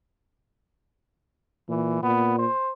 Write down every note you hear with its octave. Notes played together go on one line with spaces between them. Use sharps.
A#2 E3
A#2 B3
C5